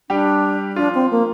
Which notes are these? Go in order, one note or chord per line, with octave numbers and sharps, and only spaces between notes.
G3 D4 G4
F3 D4 F4
C4
A#3